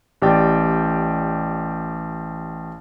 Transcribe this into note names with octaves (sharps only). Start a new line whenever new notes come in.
A1 G4 D5 G5 A6